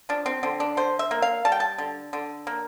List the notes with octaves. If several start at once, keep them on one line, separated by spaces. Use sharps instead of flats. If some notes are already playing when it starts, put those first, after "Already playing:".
F3 D4
C4
D3 C4
D4
D3 C5
E5
A#3
F5
G3 A5
G5
A5
D3
D3
A#3